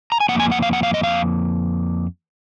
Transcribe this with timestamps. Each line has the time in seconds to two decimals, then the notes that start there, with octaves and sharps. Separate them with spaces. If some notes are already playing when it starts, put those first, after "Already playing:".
0.12 A#5
0.20 G#5
0.29 F2 D#3 A#3 F#5
0.40 G#5
0.52 F#5
0.62 F5
0.73 F#5
0.83 F5
0.94 D#5
1.04 F5